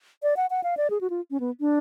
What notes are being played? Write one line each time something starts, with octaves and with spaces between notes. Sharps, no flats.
D5
F#5
F#5
F5
D5
G#4
F#4
F4
C#4
B3
D4